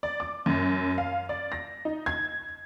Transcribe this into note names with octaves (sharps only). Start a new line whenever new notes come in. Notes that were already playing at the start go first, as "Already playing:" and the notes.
D5
D6
F#2
F5
D5
A#6
D#4
G#6